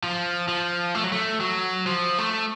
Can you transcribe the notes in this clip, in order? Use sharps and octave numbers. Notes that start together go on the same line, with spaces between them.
F3
F3
A3
F#3
A3
F#3
F3
A3